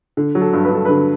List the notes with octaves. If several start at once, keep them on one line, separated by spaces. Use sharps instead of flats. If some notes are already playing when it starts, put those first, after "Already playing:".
D3
F#3
A4
G2
B4
G2 A4
D3 B4